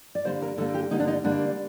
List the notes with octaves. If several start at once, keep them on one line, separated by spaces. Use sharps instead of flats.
D5
D3 G3 A#3 C5
A#4
D3 G3 A#3 A4
G4
D3 G3 A#3 D#4
D4
D#4
D3 G3 A#3 D4